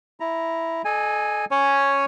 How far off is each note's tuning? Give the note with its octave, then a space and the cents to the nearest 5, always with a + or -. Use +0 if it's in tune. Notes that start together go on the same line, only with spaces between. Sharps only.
E4 +0 A#5 +5
A4 -35 D#5 -30 G#5 +0
C#4 +0 C#5 +0 G#5 +0